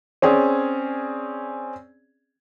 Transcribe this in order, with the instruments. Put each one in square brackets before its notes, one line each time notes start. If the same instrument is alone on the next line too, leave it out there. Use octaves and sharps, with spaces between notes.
[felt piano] C4 C#4 G#4 D5